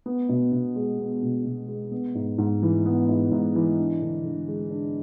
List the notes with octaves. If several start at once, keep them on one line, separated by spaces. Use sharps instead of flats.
B3
B2
B2
G#3
B3
B2
B2
G#3
B3
G#2
G#2
E3
B3
G#2
G#2
E3
D4
D3
D3
G#3
D4